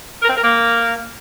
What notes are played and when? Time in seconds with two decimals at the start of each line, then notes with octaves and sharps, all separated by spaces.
0.22 A#4
0.29 C4
0.36 A#4
0.44 A#3